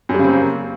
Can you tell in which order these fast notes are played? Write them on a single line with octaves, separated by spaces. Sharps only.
F#2 G3 C#3 C4 A#3